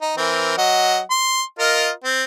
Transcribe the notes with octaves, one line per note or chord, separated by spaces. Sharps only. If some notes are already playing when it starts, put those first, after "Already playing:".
D#4
E3 C4 A#4
F#3 D#5 F#5
C6
F4 A#4 D#5
C4